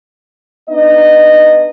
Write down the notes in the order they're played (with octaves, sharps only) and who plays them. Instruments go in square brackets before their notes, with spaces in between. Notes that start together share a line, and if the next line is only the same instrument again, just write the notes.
[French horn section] B3 D4 D#4 D#5